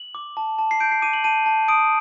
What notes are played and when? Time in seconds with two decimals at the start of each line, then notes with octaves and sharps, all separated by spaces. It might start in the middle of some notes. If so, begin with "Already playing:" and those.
Already playing: F#7
0.15 D6
0.37 A5
0.58 A5
0.71 C7
0.80 G6 D7
0.92 C7
1.02 D6 D#7
1.13 F#7
1.24 A5 D#7
1.46 A5
1.68 D#6 D7